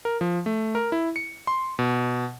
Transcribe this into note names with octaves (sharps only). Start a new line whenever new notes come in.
A#4
F3
A3
A#4
E4
C#7
C6
B2